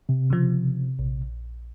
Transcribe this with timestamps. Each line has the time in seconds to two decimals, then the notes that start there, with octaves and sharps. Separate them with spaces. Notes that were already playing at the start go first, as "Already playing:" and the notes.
0.09 C3
0.30 C#3 F3
0.99 A#1